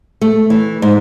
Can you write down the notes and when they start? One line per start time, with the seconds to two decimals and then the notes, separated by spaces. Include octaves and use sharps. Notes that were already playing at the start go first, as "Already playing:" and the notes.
0.21 A3
0.50 E3
0.82 G#2